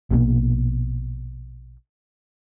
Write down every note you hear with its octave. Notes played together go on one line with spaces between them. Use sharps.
A#1 B2 E3 A#3